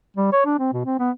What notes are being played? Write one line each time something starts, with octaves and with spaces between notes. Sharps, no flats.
G3
C#5
D4
C4
B2
C4
B3